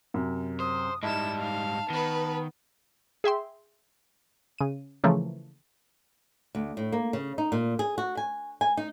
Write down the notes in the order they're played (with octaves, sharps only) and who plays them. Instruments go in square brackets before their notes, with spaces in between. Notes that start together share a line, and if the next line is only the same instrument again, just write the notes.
[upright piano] F#2 C3
[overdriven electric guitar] C5 [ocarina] D#6
[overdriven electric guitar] G#2 G3 [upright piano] D#4 F6 [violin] E4 E7 [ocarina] A5
[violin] F5
[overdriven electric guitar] D#3 [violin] B3 B4
[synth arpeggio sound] G#4 E5 G5 C6
C#3 D#7
C#3 E3 F3 A3 A#3
[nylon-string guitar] D2
A2
A#3
C#3
D#4
A#2
G#4
F#4
G#5
G#5
D#4